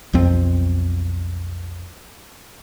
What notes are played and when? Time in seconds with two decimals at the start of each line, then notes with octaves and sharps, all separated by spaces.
0.13 B1 F2 C4